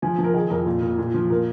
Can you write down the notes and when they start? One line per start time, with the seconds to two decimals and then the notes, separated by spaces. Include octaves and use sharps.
0.02 F3 G#5
0.19 F3
0.24 A#4
0.34 D#3 G#4
0.50 F2 A#4
0.66 A#2
0.82 A#2
0.99 A#2
1.14 F3
1.30 A#2 A#4